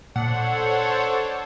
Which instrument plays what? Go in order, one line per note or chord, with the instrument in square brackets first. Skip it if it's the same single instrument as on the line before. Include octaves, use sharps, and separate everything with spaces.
[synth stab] A#2 [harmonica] D4 [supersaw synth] A4 C5 C#5 [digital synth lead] F#5